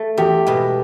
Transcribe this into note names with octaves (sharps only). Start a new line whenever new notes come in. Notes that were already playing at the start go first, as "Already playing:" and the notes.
Already playing: A3
E2 G4
B2 G#3